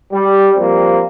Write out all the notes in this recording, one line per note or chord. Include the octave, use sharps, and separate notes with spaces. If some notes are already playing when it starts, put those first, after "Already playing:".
G3
F3 G3 A#3 C4